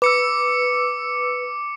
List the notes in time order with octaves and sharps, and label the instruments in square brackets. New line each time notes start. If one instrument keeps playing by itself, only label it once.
[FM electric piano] B4 E6 [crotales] D6 C#7